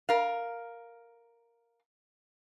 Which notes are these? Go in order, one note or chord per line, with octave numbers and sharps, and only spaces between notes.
A#4 F5